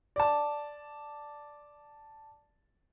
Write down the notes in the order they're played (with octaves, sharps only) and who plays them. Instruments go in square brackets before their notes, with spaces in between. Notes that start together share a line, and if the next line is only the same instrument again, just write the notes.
[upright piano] D5 A5